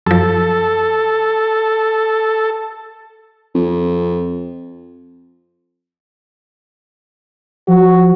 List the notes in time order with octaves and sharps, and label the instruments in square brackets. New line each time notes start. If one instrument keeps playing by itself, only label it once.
[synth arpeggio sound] F#2 F3 [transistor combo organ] A4
[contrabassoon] F2
[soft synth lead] F3 [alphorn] F#4